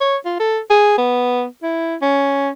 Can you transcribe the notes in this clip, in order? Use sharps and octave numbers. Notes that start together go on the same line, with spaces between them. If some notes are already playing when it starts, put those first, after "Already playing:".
C#5
F4
A4
G#4
B3
E4
C#4